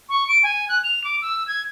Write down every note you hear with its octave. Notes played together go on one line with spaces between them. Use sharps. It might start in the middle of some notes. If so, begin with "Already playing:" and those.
C#6
D7
G#5
F#6
F7
D6
E6
G#6